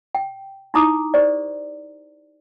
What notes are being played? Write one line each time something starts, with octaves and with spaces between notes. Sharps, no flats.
G5
D#4 E4 A#5 D6 D#6
G4 C5 D5